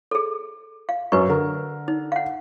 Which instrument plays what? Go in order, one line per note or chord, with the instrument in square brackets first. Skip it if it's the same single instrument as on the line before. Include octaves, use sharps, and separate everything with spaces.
[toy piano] G#4 A4
F5
[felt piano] F#2 [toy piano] B4 C#6
[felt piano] D3 A#4
[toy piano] D#4
F5 F#5